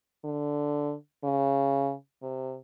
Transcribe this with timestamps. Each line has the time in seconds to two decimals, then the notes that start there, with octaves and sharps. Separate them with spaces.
0.24 D3
1.24 C#3
2.22 C3